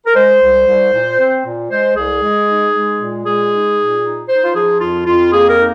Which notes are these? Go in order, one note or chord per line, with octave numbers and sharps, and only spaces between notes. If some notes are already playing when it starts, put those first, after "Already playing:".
A#4
G#3 C5
C2
C2
A#2
C4
A#2
G#3 C5
C2 G#4
G#3
D#4
G#3
A#2
G#3 G#4
D#4
A#2
D#4
D#4 C5
F4
F3 G#4
F2 F4
F2 F4
A#3 G#4
A#4
D#4